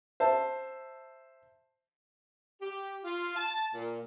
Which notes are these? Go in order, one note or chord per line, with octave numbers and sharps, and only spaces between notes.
C5 E5 A5
G4
F4
A5
A#2